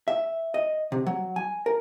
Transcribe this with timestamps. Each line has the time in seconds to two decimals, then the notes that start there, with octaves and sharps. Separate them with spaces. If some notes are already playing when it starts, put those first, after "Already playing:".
0.08 E5
0.54 D#5
0.92 C3
1.07 F#3
1.36 G#5
1.66 A#4